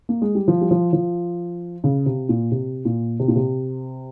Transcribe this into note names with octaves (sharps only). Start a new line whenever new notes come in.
A#3
G#3
G3
F3
G3
F3
F3
C#3
C3
A#2
C3
A#2
C3
A#2
C3